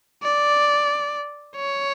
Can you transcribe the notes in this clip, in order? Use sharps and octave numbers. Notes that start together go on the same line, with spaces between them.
D5
C#5